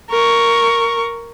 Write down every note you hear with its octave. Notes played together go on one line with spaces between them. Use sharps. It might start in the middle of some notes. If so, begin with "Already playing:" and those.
A#4 C#6